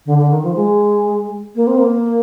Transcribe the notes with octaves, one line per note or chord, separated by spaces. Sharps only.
D3
D3
D#3
F3
G#3
A#3
C4
A#3